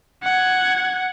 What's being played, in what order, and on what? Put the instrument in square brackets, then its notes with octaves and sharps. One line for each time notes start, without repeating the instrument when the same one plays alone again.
[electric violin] F#5 G#6